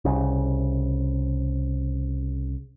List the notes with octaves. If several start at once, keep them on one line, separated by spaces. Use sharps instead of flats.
C2 C#3